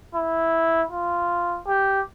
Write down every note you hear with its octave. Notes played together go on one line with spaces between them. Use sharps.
E4
F4
G4